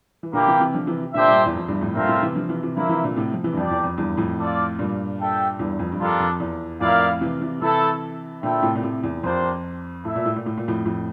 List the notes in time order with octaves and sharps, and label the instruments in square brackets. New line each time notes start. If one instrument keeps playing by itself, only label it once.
[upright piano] E3
[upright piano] A#2 D3 [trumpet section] A#3 E4 G4
[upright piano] C3 E3
C3 E3
D3 F3
C3 E3
[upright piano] A#2 D3 [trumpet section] D4 G4 C5 E5
[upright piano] G2 A#2
E2
F2
E2 G2
F2 A2
[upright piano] G2 A#2 [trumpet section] A3 C4 F4 A#4 E5
[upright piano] A2 C3
C3 E3
D3 F3
C3 E3
C3 E3
[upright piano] D3 F3 [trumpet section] A#3 E4 A#4 E5
[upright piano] C3 E3
A#2 D3
A2 C3
F3
C3 E3
G2
[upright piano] F2 [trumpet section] D4 G4 D5 G5
[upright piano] E2
F2
E2 G2
F2 A2
[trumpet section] F4 A4 D5 F5
[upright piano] G2 A#2
[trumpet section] D4 A4 E5 G5
[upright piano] E2 G2
F2
G2
[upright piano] F2 [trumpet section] G3 A#3 D4 F4 A4
[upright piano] F2
E2
[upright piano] F2 A2 [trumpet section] E4 A#4 D5 F5
[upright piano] C3 E3
C3 E3
[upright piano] C3 E3 [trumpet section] A3 E4 A4
[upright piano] A#2 D3 [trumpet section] C4 E4 A4 E5 G5
[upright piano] A2 C3
A#2
A2 C3
E2
[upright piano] F2 [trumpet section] A#3 D4 G4 C5
[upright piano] A2 [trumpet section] E4 A4 E5
[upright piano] A#2
A2
A#2
A2
A#2
F2 A2
F2 A2